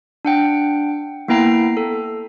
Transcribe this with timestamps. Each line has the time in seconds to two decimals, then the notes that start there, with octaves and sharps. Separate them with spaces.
0.25 D4 F#5 G5
1.28 A#3 B3 E4 G5 A#5 C7
1.77 A4